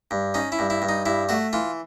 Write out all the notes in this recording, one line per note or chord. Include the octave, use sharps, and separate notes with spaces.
G2
C#4 D#4
E4
G2
E4
G2
D#4
G2 E4
A3 F#4
E3 F4